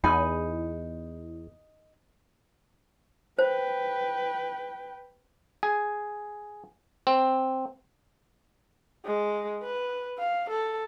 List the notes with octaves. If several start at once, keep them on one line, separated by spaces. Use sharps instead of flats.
E2 D#4 G#5 B5
B4 C5 G5
G#4
C4
G#3
B4
F5
A4